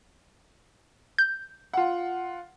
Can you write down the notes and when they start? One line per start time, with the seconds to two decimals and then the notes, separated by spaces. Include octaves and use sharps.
1.18 G6
1.73 F4 F#5